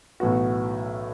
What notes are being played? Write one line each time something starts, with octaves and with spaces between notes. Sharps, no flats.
B1 A2 E3 B3 F#4